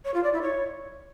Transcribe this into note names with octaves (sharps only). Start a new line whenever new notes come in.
C#5
F4
D5
E4
C#5